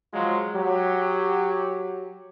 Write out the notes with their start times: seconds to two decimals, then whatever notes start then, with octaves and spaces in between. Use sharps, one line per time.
0.14 F3 F#3 G#3 F4
0.54 F#3 G4